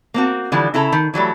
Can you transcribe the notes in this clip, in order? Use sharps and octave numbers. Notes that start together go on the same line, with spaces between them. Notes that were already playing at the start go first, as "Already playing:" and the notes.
A#3 C4 F#4
D3 E3 F3 G3
C#3 E4 A4 A#5
D#3
E3 F#3 G3 A3